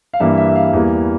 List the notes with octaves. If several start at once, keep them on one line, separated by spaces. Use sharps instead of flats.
F5
G2 E3 G3 A#3 E5
E5
E5
F5
E2 E3 G3 A#3